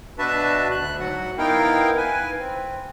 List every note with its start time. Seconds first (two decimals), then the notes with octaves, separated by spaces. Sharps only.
0.18 B2 D4 F#4 B4 E5 A5
0.71 D2 F#6
1.00 G#2 F#3 F#4 F#5
1.38 B3 D#4 E4 A#4 F5 G5
1.97 B4 G#5
2.39 C4